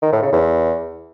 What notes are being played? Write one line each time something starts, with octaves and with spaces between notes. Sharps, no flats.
D#3
A2
C#3
E2